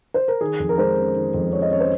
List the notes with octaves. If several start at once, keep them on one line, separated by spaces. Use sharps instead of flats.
C5
A#4
D#3 G#4
F2
A#4
G#3 C5
C#4
D#3
F2
G#3 C#5
D#5
C#4 C#5
C5